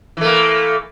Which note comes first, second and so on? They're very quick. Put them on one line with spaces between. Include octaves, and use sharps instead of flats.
E3 A3 A#3